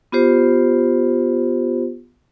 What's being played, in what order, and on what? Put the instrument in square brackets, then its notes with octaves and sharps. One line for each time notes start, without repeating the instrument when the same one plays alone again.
[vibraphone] B3 F4 G4 C5